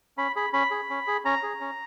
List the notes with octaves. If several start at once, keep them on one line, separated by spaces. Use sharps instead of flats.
C#4 B5
G#4 B5
C#4 B5
G#4
C#4
G#4
C#4 A#5
G#4
C#4